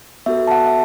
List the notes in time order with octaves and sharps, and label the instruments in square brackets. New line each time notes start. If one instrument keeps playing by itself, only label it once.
[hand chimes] B3 F#4 A4 E5
A5
F#5
E5